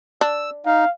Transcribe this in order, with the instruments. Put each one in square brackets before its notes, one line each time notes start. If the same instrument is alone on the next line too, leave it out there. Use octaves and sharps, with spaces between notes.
[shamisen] D4 [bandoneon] E6
[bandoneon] D#4 [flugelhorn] F5